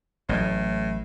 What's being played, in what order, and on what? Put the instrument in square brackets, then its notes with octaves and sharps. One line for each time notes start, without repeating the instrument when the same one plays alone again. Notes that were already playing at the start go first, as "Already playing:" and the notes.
[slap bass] A1 F#3 [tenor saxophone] A2